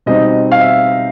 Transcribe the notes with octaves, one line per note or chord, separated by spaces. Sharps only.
B2 G3 C4 D#4 D#5
F5
E5